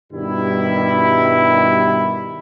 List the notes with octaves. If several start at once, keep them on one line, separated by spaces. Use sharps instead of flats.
G2 B2 D#3 G3 E4